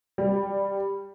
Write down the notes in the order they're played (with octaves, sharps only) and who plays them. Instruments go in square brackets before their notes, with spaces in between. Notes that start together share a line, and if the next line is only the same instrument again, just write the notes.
[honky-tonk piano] G3